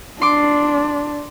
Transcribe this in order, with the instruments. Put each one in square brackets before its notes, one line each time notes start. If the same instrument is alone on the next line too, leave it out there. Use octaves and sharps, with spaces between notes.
[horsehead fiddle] D4 [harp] C6 D6